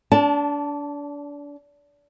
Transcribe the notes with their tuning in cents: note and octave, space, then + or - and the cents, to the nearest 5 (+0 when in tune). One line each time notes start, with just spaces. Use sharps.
D4 -30 A5 +0